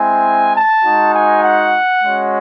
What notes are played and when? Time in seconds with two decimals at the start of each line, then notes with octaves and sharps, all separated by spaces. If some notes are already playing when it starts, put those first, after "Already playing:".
Already playing: G#3 C4 E4 G#5
0.55 A5
0.84 G#3 D#4 F#4
1.13 G#5
1.43 F#5
2.03 G#3 C#4 F#4